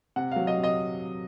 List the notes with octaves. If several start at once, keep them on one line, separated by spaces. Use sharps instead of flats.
C3 F#5
F#3 F5
D#5
C3
D#5